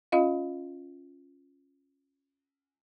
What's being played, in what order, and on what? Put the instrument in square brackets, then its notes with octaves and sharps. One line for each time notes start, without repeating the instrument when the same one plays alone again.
[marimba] C#4 F4 D#5 F5